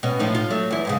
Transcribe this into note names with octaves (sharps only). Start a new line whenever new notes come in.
B2 C#4
A2 F3 D#4
F4
F#3 A3
E2 E4
F2 G#2 C#3